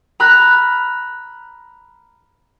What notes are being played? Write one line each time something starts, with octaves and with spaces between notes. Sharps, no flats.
A#5 B5 F6 F#6